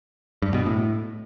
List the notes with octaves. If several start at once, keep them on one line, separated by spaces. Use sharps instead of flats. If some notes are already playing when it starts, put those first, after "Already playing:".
G2
B2
A2